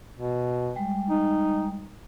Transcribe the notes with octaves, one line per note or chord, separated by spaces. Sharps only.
B2
G3 G#3 G5
D#4